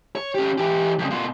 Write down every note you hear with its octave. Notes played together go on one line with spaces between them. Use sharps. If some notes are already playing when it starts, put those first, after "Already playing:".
C#5
C#4 G4
E3 G4
F2 C#3
B2 F4